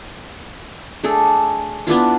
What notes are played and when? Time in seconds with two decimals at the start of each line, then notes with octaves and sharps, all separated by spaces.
1.04 A3 D4 G#4 A4
1.87 B3 D4 E4 F4